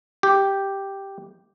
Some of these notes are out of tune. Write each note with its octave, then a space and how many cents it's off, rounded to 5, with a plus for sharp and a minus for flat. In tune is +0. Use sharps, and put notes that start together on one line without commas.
G4 +0